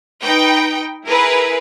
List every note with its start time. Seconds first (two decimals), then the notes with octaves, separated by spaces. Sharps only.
0.22 D#4 B4 G5
1.07 E4 G#4 A#4 B4